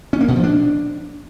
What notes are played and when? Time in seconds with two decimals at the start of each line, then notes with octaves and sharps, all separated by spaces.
0.13 C#4
0.21 A#3
0.28 B2
0.36 F3
0.43 D4